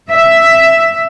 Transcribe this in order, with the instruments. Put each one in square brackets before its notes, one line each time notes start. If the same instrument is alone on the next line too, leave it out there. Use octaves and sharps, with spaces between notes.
[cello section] E5